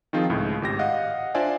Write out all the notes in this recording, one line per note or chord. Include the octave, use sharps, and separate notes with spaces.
D#3 F3 C4 D#4 F4 G#4
C#2 A2
G#1 G4 A#6
D#5 F5 F#5
D4 F4 C5 D5 E5 G#5